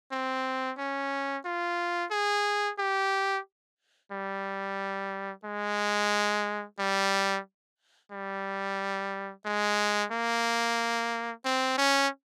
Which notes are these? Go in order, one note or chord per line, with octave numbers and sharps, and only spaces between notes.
C4
C#4
F4
G#4
G4
G3
G#3
G3
G3
G#3
A#3
C4
C#4